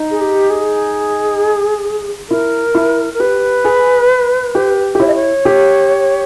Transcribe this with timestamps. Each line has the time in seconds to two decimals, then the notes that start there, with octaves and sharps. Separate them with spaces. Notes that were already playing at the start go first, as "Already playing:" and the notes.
Already playing: D#4
0.11 G#4
0.21 G4
0.50 G#4
2.29 E4 A#4
2.75 E4
3.14 A#4
3.20 G4 B4
3.65 G#4
4.55 G4
4.95 G4
5.00 E4 C#5
5.07 D#5
5.15 C#5
5.45 G4